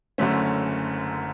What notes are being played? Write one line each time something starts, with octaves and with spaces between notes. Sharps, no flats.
F#1 F#2 D3 A3 C#4